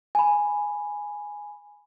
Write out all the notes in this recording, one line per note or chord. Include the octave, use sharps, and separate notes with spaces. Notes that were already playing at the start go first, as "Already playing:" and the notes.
G#5 B5